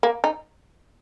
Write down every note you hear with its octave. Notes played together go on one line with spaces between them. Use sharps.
A#3
D#4